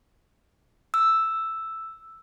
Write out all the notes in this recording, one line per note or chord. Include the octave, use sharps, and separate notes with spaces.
E6